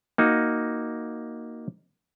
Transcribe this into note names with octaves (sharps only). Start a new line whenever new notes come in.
A#3 D#4 F#4